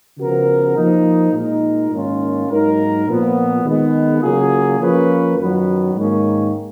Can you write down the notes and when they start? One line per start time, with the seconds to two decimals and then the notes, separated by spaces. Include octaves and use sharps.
0.18 C#3 F3 B3 F#4 A#4
0.76 F3 A#3 D#4
1.33 A#2 G#3 D#4 A#4
1.91 G#2 D#3 A#3 C#4 F4
2.49 G#2 F#3 A#3 D#4 A#4
3.07 A#2 F3 B3
3.65 D#3 G#3 B3
4.22 C#3 F#3 A#3 F4 G#4
4.80 F3 A#3 C#4 F4 B4
5.38 F#2 D#3 F#3 B3
5.95 G#2 D#3 A#3 C#4